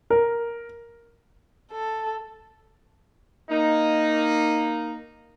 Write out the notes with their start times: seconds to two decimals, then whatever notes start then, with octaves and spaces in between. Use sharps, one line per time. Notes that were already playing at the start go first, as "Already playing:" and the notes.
0.10 A#4
1.72 A4
3.50 A#3 D#4